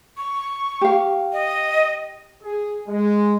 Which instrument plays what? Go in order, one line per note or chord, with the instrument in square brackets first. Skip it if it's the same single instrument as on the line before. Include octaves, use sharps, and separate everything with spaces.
[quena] C#6
[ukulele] G4 F5
[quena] D#5
[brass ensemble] G#4
G#3